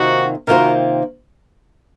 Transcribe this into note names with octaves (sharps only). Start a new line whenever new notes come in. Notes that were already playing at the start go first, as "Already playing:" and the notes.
Already playing: C3 D#3 A#3 D#4 F4 F#4 C5
C3 D#3 A#3 F4 F#4 A#4 C5